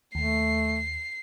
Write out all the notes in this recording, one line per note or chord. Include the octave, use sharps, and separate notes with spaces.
D#2 A3 C7